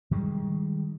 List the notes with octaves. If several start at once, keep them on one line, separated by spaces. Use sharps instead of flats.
D#3 G3 G#3